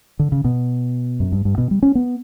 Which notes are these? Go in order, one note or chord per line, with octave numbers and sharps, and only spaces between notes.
D3
C#3
B2
F#2
G2
G2
B2
G3
C#4
B3